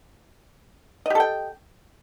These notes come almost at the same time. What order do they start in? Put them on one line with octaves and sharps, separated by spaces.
D#5 G4 A4 G5